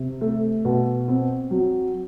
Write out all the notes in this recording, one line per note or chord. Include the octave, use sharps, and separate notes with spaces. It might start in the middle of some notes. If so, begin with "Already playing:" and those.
Already playing: C3
A3
B2
C4
F#3